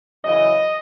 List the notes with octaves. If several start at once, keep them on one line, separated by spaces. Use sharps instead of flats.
F#2 C#3 E3 D#5